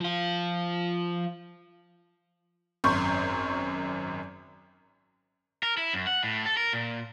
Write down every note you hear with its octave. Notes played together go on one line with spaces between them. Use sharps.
F3 F4
G#1 F#2 C6 C#6 G6
A#4
E4
F#2
F#5
A2
A4
A#4
A#2